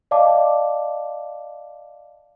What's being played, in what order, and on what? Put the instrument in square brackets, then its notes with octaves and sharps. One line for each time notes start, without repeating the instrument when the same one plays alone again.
[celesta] D5 D#5 F5 A5 D6